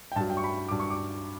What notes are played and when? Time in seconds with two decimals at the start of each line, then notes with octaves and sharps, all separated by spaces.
0.12 G5
0.16 G2 F#3 A5
0.30 G5
0.37 C#6
0.44 B5
0.68 G2 F#3 D6
0.80 C#6
0.90 D6